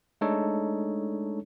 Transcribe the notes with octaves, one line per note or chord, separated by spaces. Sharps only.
G#3 A3 D4 D#4 A4 C#5